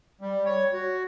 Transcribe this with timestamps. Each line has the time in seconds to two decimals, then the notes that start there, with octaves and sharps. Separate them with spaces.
0.21 G3
0.45 C#5
0.73 F#4